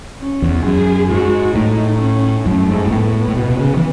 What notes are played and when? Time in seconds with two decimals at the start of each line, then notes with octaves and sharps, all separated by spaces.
0.20 C#4
0.42 E2
0.65 F#2 G#4
1.10 G#2 F#4
1.55 A2 D#4
2.00 C#4
2.46 F#2 A3
2.69 G#2
2.87 G#2
2.91 A2 B3
3.28 A2
3.37 B2
3.50 B2
3.59 C#3
3.77 E3